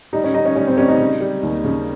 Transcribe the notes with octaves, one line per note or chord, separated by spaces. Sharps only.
G3 D#4
C#4
G3 D#4
C#4
G3 C#4
C4
G3 C#4
D#4
C#3
G3
D#2
C#3